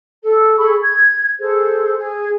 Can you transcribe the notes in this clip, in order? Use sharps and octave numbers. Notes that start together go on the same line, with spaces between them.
A4
G#4 A4 B5 C#6
G#6
G#4 A4 C5
G#4